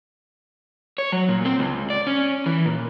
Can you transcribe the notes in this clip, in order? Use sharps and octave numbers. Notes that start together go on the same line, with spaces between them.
C#5
F#3
A#2
C4
C#2
D5
C#4
E3
A#2